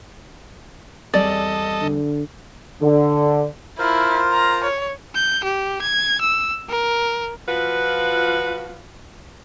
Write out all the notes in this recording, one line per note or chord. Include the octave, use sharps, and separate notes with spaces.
E2 G3 C4 A4 D5 D#5
D3
D3
E4 F4 A#4 C5
A#5
C#5
G6
G4
G#6
E6
A#4
F3 F4 F#4 B4